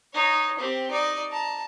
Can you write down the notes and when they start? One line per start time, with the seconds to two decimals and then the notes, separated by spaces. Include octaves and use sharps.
0.13 D#4 C#5
0.59 C4 G4
0.91 D#4 D5
1.32 A5 A#5